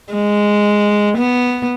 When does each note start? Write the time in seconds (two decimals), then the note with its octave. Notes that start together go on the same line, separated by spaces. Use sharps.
0.13 G#3
1.18 B3